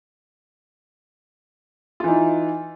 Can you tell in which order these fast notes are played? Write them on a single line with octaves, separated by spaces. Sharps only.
F4 E3 D#4